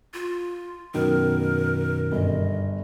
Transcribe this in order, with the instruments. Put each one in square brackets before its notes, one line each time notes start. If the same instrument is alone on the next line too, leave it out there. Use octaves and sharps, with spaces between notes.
[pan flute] F4
[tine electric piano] F#2 B2 D#3 [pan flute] A#4
[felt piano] G1 [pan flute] D#5